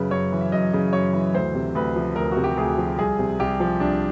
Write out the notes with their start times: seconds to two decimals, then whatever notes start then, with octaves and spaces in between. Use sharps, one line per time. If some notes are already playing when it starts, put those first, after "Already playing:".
Already playing: F#2 C#3 B4
0.11 F#2 C#5
0.32 E3
0.41 E5
0.52 F#2 D#5
0.73 C#3
0.93 F#2 C#5
1.13 E3
1.34 D2 C5
1.55 C3
1.75 D2 B4
1.96 F3
2.16 D2 A#4
2.32 C3 F#4
2.44 G4
2.57 D2 G#4
2.77 F3
2.98 C2 G#4
3.19 C3
3.39 C2 G4
3.60 F3
3.80 C2 D4